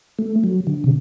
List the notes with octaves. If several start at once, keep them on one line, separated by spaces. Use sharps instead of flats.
A3
F#3
D3
C3